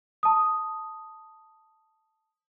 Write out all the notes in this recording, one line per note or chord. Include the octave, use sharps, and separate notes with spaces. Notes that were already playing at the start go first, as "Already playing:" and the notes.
A5 D#6